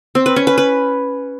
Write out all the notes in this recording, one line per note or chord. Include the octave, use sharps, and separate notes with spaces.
C4
B4
C#4
B4
B4